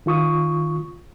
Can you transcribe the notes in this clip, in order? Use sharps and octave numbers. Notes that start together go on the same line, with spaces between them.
D#3 F4 C#6 D#6